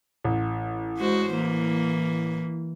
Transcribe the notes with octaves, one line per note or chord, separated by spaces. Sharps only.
A1
G#3 F#4 C5
E3 A#3